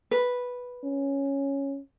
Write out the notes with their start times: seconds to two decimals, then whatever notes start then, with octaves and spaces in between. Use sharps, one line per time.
0.11 B4
0.84 C#4